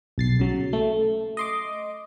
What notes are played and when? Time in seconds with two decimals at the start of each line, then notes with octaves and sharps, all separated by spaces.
0.18 B1 A6 C7
0.39 C#3 F#3
0.73 A3
1.37 D#5 C6 D6